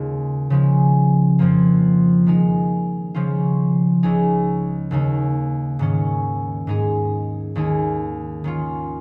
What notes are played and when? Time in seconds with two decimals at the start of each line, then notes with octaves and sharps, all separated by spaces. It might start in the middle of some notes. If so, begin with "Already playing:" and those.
Already playing: D#2 C#3 G#3 A#3 F4
0.50 C#3 F3 G#3
1.39 F2 F3 A#3
2.26 D#3 G#3 D#4
3.14 C#3 F3 C#4 F4
4.03 C#2 C#3 G#3 D#4 G#4
4.91 D#2 C#3 A#3 D#4
5.79 G#2 D#3 C#4
6.67 G#2 G#3 D#4 G#4
7.55 D#2 D#3 G#3 D#4 G#4
8.44 D#3 C#4 F4